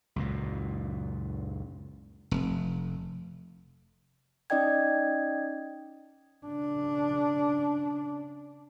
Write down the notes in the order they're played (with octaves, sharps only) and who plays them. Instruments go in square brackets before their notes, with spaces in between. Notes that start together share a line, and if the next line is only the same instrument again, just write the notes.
[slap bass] C#2 F#2 A#2
F1
[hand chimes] C#4 D#4 D5 D#5 G5 G#6
[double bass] C#3 D4